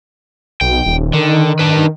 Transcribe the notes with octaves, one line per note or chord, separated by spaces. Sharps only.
B1 G5
D#1
D3 D#3
D4 B4